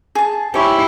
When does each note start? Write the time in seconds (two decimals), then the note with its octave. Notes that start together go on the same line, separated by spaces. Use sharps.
0.15 G#4 A5
0.54 E4 G4 C5 C#5